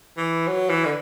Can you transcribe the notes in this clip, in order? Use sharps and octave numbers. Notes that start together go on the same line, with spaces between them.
E3
F#3
E3
D3